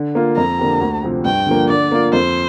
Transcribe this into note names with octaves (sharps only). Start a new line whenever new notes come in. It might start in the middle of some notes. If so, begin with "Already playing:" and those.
Already playing: D3
A#3 F4
F2 A#5
D3 A#3 G4
D2
C3 F3 C4 G4
G2 G5
D3 F3 A#3
D3 D5
A#3 F4
F2 C5